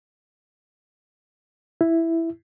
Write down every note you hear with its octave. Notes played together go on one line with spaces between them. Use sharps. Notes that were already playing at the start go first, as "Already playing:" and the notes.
E4